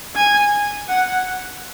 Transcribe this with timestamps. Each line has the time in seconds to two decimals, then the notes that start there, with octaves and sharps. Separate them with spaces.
0.16 G#5
0.89 F#5